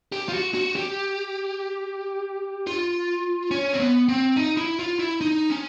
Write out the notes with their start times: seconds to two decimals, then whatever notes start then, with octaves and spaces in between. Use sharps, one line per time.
0.12 G4
0.29 F4
0.33 F#4
0.54 F#4
0.76 G4
2.67 F4
3.51 C#4
3.73 C4
3.80 B3
4.09 C4
4.36 D#4
4.57 E4
4.79 F4
4.99 E4
5.21 D#4
5.50 C#4